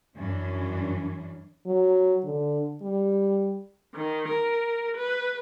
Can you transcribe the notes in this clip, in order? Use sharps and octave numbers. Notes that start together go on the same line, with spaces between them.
F#2 E3 C#4 D4
F#3
D3
G3
D#3
A#4
B4